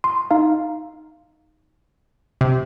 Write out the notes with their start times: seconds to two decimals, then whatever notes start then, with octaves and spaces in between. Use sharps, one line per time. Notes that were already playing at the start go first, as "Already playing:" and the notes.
0.04 C6
0.31 D#4 F5
2.41 C3